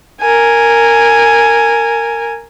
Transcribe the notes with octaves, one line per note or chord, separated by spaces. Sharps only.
A#4 G#5